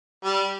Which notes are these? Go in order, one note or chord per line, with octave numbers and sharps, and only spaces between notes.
G3